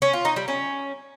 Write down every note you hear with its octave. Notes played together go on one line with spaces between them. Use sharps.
C#4
F4
D#4
G3
C#4